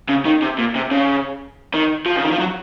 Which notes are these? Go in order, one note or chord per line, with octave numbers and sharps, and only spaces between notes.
C#3
D#3
C3
A#2
C3
C#3
D#3
F3
C#3
D#3
F3
F#3